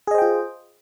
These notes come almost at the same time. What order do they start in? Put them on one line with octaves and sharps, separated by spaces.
G#4 D#5 C5 G5 F4